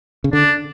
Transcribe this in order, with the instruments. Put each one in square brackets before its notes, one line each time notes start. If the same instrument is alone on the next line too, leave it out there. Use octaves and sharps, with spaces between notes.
[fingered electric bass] C#3
[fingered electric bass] D3 [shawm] D4